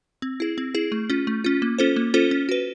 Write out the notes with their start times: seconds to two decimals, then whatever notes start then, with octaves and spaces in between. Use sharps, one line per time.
0.22 C4
0.40 E4 G#4
0.58 C4
0.75 E4 G#4
0.92 A3
1.10 C#4 F4
1.27 A3
1.44 C#4 F4
1.62 A#3
1.79 C#4 F4 A4 C5
1.96 A#3
2.14 C#4 F4 A4 C5
2.31 C#4
2.49 F#4 B4